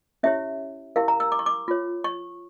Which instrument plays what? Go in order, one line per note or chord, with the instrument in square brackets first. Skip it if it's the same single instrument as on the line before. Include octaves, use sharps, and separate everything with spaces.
[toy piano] C#4 E4 G4 C#5 E5
E4 G4 A#4 F5
A#5
E6
D6
C#6
D6
F4 C#5
C#6